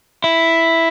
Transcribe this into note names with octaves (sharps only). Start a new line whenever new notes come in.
E4